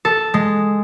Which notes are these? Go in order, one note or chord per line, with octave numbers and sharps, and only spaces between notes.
A4
G#3